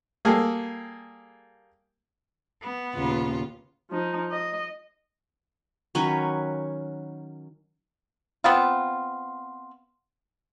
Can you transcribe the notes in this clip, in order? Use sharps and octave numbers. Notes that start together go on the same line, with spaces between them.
G3 A#3 G#4 A4
B3
D#2 A#2 C#3 F4
F3 D#4
D#5
D#3 F#3 C#4 B4
B3 C4 F4